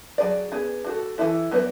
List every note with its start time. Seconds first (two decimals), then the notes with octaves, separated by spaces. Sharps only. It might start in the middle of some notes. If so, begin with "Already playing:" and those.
0.18 F#3 A3 D4 G#4 D5
0.52 B3 D4 G#4
0.85 D4 F#4 A4
1.18 E3 A3 E4 A4
1.51 F#3 B3 D4 F#4 B4